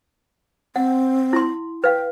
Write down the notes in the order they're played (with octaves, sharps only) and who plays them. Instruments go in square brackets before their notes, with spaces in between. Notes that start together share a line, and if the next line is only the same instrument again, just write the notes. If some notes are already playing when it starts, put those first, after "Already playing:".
[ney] C4 [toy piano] F#5
[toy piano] E4 C6
[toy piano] B4 F5 [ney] G5